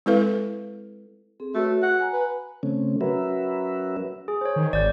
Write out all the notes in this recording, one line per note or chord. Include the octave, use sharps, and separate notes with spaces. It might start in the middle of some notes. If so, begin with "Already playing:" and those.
G#3 C4 E4 A4 B4 F5
C4 G#4 A4
A3 F#4 B4 C#5
F#5
G#5 A#5
B4
C#3 A3 C4 C#4
F#3 C#4 F#4 A#4 B4 E5
G#4
C5 C#5
D#3
G#1 D5 G6